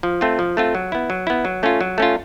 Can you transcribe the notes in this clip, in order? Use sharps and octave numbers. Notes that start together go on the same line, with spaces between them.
F3
A3 C4 F4
F3
A3 C4 F4
F#3
B3 E4
F#3
B3 E4
F#3
A3 C#4 F4
F#3
A3 C#4 F4